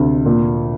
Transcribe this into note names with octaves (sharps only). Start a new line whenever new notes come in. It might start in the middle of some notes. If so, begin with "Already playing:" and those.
Already playing: D2 C3
A#2